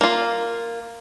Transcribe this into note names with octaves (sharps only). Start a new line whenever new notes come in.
A#3 F4